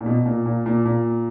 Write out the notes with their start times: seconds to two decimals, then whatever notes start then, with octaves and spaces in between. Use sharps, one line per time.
0.01 A#2
0.06 B2
0.26 A#2
0.46 A#2
0.66 A#2
0.85 A#2